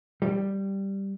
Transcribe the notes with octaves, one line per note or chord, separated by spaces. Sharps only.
G3